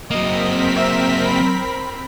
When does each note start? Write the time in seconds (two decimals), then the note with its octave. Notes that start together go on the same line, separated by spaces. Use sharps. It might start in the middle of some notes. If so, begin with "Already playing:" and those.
0.11 F#3 A#3 C4 A#4 D#5 B6
0.76 E5
1.27 B5